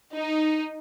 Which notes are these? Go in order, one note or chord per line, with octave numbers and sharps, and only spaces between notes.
D#4